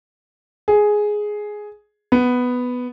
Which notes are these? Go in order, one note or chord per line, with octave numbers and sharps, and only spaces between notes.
G#4
B3